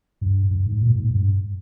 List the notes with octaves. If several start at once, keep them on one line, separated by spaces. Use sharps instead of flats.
G2
G2
G#2
A#2
G#2
G2